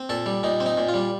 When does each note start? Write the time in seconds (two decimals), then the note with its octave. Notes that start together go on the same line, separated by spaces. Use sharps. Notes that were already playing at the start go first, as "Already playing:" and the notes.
Already playing: C4
0.09 A#2 A4
0.26 G3
0.43 A#2 D#4
0.60 C4
0.66 D#4
0.77 A#2
0.89 F4
0.94 G3